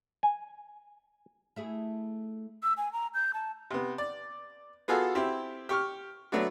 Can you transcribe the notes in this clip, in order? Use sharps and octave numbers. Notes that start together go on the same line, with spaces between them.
G#5
A3 E4 G#4
E6
G#5
A#5
G6
A5
C3 B3
D5
B3 F4 F#4 G#4 A4
C4 E4 G4
G4 C#6 F6
F#3 A3 B3 D4 F#4